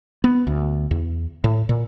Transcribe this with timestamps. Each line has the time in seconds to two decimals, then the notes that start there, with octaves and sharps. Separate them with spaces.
0.24 B3
0.47 D2
0.91 E2
1.44 A2
1.69 A#2